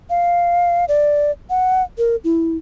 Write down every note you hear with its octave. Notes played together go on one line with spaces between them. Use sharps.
F5
D5
F#5
A#4
E4